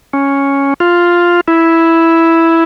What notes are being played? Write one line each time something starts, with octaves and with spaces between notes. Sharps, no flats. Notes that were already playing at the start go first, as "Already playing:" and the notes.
C#4
F4
E4